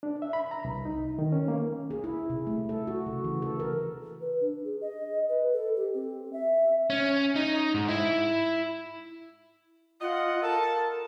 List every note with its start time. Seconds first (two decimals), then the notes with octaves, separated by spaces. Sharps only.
0.03 D4
0.22 E5
0.33 B5
0.51 A#5
0.65 C2
0.85 D#4
1.19 D#3
1.32 C#4
1.48 A#3
1.91 G#4
2.04 E4
2.30 C3
2.47 A3
2.69 A4
2.87 F#4
3.06 C#3
3.24 E3
3.42 A4
3.60 A#4
4.21 B4
4.41 D4
4.64 G#4
4.81 D#5
5.29 B4
5.53 A4
5.76 G4
5.94 C4
6.33 E5
6.90 C#4
7.36 D#4
7.74 G#2
7.89 E4
10.01 F4 D#5 F#5
10.42 A4 A#4 A5